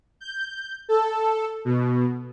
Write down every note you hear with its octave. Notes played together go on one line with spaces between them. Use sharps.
G6
A4
B2